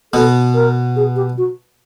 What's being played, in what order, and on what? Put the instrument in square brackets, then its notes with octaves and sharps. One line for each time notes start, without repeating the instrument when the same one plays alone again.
[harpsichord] B2 B3 [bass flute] A4
[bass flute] A#4
G#4
G4
F#4